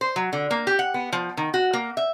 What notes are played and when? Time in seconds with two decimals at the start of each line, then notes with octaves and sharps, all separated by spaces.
0.01 C5
0.16 F#3
0.33 D3
0.51 A#3
0.67 G4
0.79 F#5
0.94 B3
1.12 F3
1.37 D#3
1.54 F#4
1.73 A#3
1.97 E5